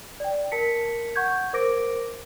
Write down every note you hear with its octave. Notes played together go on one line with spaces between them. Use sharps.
D5 G5
A#4 A5 B6 C#7
F#5 C#6 G6 G#6
A#4 C5 D6 A#6 D7